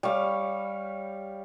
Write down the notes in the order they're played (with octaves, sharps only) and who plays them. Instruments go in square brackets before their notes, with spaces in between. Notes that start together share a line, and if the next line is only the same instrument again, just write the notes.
[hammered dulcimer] G3 C#5 F5